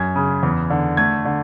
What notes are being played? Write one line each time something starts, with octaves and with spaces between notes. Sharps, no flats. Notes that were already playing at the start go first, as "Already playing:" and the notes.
Already playing: F#2 G#6
C#3
E2
D3
A3 G#6
D3